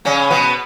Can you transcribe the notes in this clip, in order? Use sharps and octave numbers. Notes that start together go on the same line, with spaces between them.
C#3 C#4
B2 B3